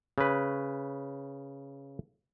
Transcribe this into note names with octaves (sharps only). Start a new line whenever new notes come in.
C#3 B4